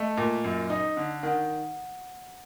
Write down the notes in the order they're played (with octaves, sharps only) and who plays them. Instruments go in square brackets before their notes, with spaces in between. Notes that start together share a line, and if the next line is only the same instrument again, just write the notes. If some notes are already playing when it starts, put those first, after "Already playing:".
Already playing: [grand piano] A3 [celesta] D#5
[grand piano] A#2
F#2
D#4
D3
[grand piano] D#3 [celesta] F#5